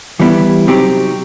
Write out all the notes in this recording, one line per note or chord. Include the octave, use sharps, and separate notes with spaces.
E3 G3 B3 E4 G4
C3 F#3 C4 D#4 G4